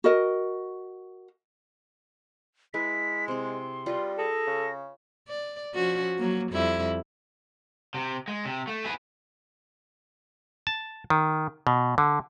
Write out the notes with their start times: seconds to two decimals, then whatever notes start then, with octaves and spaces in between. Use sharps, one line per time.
0.04 F#4 A#4 D#5
2.74 G#3 E4 B4 B6
3.28 C3 G#4 C6
3.86 G3 F4 B4 D#5
4.19 G#4 A4 A#6
4.47 C#3
5.28 D5
5.75 F3 C#4 F#4
6.18 F#3 A#3
6.53 F2 G3 E4
7.94 C3
8.28 G#3
8.45 C3
8.67 A3
8.84 G#4 B4
10.67 A5
11.10 D#3
11.67 B2
11.98 D3